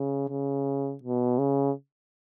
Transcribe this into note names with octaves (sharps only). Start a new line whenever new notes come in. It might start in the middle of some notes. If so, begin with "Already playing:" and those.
Already playing: C#3
C#3
B2
C#3